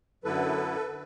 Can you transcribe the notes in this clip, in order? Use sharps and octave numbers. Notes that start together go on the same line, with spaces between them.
F#2 D3 F#3 B3 E4 A4 B4
D3